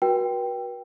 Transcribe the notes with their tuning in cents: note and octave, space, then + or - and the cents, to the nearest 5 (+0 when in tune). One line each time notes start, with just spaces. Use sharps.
F#4 +0 B4 -40 G5 +0